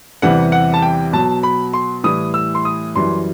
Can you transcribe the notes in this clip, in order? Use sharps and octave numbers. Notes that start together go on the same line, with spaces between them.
E2 C3 E3 G3 F#5
F#5
A5
G5
B2 F#3 A5
B5
C6
A2 E3 G3 D#6
E6
C6
D#6
F#2 E3 G3 C6